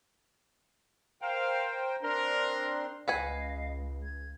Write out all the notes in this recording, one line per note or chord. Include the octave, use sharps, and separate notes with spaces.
A#4 C5 F5 G5
C4 D4 A#4 C6
C#2 B4 D#5 F5 F#5 G#5
G#6